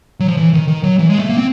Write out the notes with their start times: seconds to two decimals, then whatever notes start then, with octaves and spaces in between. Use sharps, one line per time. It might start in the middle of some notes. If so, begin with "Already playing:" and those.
0.20 F#3
0.28 F3
0.37 E3
0.53 D#3
0.68 D#3
0.83 F#3
0.99 E3
1.10 G#3
1.19 A3
1.29 A#3
1.37 C4